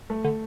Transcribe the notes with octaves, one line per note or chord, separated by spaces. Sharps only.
A3
D3